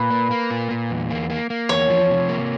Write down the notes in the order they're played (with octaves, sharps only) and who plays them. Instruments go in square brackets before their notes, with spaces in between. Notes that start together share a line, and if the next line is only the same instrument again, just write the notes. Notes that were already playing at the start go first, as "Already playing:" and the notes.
Already playing: [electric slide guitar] A#2 [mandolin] B4
[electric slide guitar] A#3
A#3
A#2
A#2
E2
A#3
A#3
A#3
[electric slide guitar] E2 [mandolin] C#5
[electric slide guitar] F3
C3
A#3